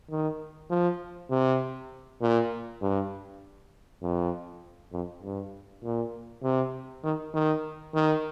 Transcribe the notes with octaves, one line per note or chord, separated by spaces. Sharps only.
D#3
F3
C3
A#2
G2
F2
F2
G2
A#2
C3
D#3
D#3
D#3